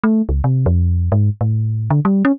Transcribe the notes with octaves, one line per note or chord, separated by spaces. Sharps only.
A3
C#2
C3
F2
G#2
A2
D3
G3
C#4